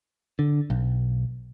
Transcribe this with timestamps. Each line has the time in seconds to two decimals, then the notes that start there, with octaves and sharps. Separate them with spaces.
0.39 D3
0.70 B1